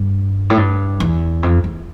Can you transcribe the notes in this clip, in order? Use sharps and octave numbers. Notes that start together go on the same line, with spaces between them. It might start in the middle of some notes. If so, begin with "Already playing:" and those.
Already playing: G2
A2
G2
E2
F2
E2